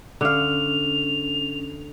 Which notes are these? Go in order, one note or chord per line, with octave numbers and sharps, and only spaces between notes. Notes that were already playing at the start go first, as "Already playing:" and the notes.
D3 C#4 F5 F7